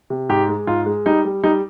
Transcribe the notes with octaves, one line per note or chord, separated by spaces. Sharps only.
C3
G#2 G4
G#3
G#2 F4
G#3
G3 D#4
G3
G3 D#4